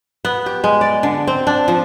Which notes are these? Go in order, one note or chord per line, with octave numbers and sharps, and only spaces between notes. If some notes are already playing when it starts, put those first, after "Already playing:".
B3
G4
G#3
D5
D3
C4
D4
F3